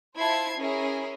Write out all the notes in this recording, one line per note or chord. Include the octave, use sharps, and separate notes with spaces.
E4 F4 C5 A5 G#6 C7
C#4 E4 G#4 A#4